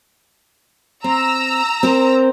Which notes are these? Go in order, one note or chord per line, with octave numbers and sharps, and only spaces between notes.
C4 A#5 E6
C4 A#4 C5